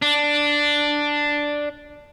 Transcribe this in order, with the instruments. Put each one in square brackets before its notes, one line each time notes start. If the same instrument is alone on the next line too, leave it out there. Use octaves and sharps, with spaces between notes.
[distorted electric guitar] D4